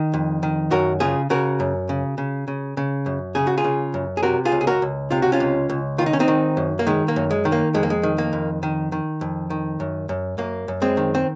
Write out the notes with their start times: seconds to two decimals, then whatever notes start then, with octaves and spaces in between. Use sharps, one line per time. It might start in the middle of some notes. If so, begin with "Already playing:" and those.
Already playing: D#3
0.14 F2
0.43 D#3
0.71 F#2 F#4 A#4
1.00 C#3 F4 G#4
1.30 C#3 F#4 A#4
1.60 F#2
1.89 C#3
2.18 C#3
2.48 C#3
2.77 C#3
3.06 F#2
3.35 C#3 G#4
3.47 F#4
3.57 F4 G#4
3.64 C#3
3.94 F#2
4.17 G#4
4.23 C3 F#4 A#4
4.45 F4 G#4
4.52 C#2
4.61 G#4
4.67 F#4 A#4
4.82 C#2
5.11 C3 F4
5.22 F#4
5.32 C#4 F4
5.40 C#2
5.70 C#2
5.98 D#3 F4
6.06 D#4
6.13 C#4
6.20 C4 D#4
6.28 D#3
6.57 F#2
6.79 A#3
6.87 D#3 G#3
7.08 A#3
7.16 F#2
7.31 G#3
7.45 D#3
7.52 A#3
7.74 F2 G#3
7.83 A#3
7.90 G#3
8.03 D#3
8.18 A#3
8.33 F2
8.63 D#3
8.92 D#3
9.21 F2
9.50 D#3
9.80 F#2
10.09 F#2
10.38 F#2 A#3
10.68 F#2
10.82 G#3 C4
10.97 D#3
11.15 C4